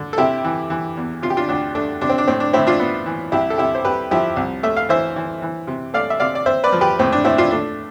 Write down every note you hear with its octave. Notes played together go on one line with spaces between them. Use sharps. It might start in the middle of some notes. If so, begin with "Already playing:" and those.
Already playing: D3
A4
C3 E4 G4
E3
E3
E2
C3 F4
G4
D4 F4
D2 D4
A3 D4
C3 D4
C4
D4
A2 C4
D4
A2 C4 E4
D4 F4
B3
E3
C2 E4 G4
A4
C3 E4 G4
C5
C2 G4 B4
F3 E4 G4
C2
A3 E5
F5
E3 C5 E5
E3
E3
C3
A3 D5 F5
E5
C3 D5 F5
D5
C4 C5 E5
B4 D5
F3
G4 B4
A2 C4
D4
A2 C4 E4
D4 F4
A3 D4